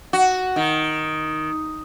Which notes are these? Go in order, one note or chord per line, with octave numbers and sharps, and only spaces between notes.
F#4
D#3